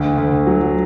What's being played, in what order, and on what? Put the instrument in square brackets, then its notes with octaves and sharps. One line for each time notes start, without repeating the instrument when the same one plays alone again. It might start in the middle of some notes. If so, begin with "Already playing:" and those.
Already playing: [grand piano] D2
D2
F#3